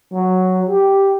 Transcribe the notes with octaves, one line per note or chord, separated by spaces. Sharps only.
F#3
G4